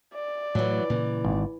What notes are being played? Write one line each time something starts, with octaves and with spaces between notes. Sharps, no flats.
D5
A2 E3 F#3 A3
A#2 C#3 E3
G#1